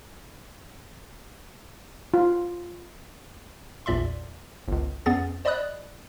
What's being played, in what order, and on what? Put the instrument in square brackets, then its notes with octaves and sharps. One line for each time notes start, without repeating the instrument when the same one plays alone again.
[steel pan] F4
[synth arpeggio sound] A#1 E2 A#2 D5 E5 C6
G1 C#2
F2 B3 C#4 G#4 A6
C5 D5 D#5 B5 D#6 F#6